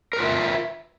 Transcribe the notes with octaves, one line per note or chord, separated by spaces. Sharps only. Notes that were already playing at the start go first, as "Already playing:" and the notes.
F4 A#4 B4 E5